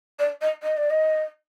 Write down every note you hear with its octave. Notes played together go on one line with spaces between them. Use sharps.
D5
D#5
D#5
D5
D#5